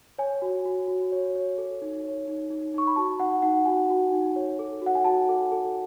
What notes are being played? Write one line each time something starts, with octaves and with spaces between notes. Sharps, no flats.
C#5 G#5
F#4
F#4
F#4
C#5
C#5
A4
D#4
C#5
D#4
D#4
D#4 C#6
B5
F#4 A5
D#4 F#5
D#4 F#5
F#4 G#5
F#4
D#4
C#5
A4
F#4 F#5
G#5
F#4 A5
A4
A4